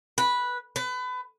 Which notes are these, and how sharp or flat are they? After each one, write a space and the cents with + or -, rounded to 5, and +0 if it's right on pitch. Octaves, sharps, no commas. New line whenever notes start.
B4 -10
B4 +30